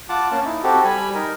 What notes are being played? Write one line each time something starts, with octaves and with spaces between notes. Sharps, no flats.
F4 F#5 A5 D6
A#3 C#4 A5
D#4 E4
C4 F#4 G4 A4
G3 G#5 B5
D#4 A#4